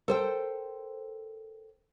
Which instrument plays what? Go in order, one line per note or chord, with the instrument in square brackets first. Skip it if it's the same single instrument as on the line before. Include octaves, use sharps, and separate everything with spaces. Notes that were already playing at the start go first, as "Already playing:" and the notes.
[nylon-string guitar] A4 C5 G5 [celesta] A#4